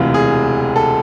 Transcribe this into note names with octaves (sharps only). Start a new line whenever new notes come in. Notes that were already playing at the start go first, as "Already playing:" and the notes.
Already playing: E1 D2 C3 E3 F4
G#4
A4